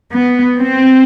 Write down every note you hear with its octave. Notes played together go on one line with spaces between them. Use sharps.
B3
C4